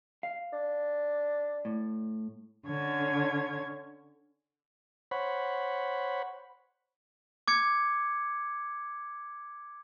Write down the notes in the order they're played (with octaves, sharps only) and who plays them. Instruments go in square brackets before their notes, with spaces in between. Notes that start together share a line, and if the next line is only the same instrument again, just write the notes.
[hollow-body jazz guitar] F5
[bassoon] D4
[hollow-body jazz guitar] A2
[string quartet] D3 C#4 C#5 G#6
[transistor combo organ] C5 C#5 F#5 B5
[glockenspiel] D6 G#6 C#7